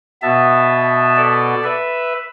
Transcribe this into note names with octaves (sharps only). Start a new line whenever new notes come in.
B2 B3 E5 A5
A4 D5
B4 E5